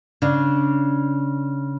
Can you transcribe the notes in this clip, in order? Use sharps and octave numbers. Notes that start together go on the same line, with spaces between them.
C#3 D4